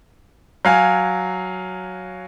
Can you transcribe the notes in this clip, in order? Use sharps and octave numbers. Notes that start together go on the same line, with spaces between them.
F#3 F5 G#5